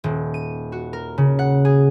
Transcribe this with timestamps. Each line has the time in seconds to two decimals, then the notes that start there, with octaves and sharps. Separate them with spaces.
0.04 D#1
0.34 D#7
0.72 F#4
0.93 A#4
1.18 C#3
1.39 F#5
1.65 G#4